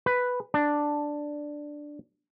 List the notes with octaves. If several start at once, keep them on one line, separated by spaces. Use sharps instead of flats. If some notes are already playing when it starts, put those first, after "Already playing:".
B4
D4